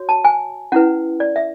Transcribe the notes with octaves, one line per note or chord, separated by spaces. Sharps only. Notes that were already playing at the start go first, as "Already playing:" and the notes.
Already playing: F#4 C#5
A5
G#5
C#4 E4 B4 F#5
D5
E5